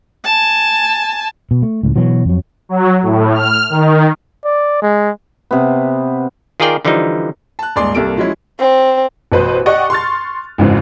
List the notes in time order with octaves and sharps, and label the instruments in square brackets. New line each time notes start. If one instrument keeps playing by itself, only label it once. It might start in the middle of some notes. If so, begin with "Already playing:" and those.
[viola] G#5 A5
[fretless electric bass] B2
A3
C#2 A2
B2 E3 F#3
F2 F#3
[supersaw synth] F#3
A2
F6
D#3
[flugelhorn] D5
G#3
[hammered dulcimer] C3 B3
[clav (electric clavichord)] D#3 F4 G#4 A#4 D5 G5
D3 E3 F3 G3 D#4
[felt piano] A5 F#6
D#1 G#2 G#4 D5 C6 D6
C2 G3 A#3 A4 D7
F3 F#3 G#3 C#4 E4
[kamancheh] C4
[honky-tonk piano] A1 B2 B4 C5 C6
G4 D5 D#5 F#5 C#6 F#6
C6 C#6 F6 A6
G#1 F2 G#2 C#3 E3 C4